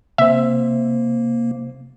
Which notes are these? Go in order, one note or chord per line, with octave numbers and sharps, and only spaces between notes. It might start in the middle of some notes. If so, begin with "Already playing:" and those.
C3 A#3 C5 E5